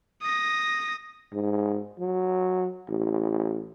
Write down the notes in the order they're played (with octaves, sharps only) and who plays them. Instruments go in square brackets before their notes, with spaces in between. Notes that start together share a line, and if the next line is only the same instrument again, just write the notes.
[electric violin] D#6 A#6
[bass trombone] G#2
F#3
A1